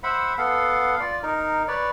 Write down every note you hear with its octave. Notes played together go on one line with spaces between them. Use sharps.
C5 E5 F#5 B5
B3 A4 F5 F#5
F4 D5
D#4 A#4
B4 C#5 D5